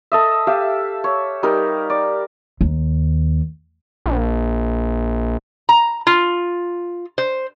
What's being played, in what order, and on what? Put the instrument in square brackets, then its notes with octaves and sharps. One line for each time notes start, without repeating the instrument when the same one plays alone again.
[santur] A4 D#5 E5
G4 E5 F5
C#5
G3 D#4 A#4
D5
[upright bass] D#2
[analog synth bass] A#1
[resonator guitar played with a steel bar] A#5
F4
C5